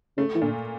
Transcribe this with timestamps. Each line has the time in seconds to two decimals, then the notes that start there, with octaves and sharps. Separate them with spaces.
0.18 C#3 A3
0.35 E3
0.42 A#2 D3